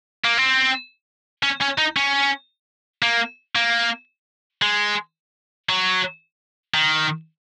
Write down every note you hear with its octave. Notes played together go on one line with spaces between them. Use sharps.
A#3
C4
C#4
C#4
D#4
C#4
A#3
A#3
G#3
F#3
D#3